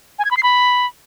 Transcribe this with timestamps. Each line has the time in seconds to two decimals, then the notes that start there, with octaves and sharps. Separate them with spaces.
0.19 G#5
0.25 G#6
0.31 B5
0.37 C7
0.43 B5